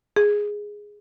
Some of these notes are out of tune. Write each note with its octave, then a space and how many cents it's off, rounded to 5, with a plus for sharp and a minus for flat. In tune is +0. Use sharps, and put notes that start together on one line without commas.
G#4 -5